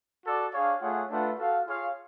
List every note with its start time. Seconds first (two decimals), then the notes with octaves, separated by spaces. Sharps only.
0.24 F#4 A4 D5
0.52 D4 G#4 C#5 F5
0.80 A3 F4 G#4 C#5 F#5
1.09 A3 D4 F4 B4 F#5
1.37 F#4 A4 F5
1.65 F4 G#4 C#5 F5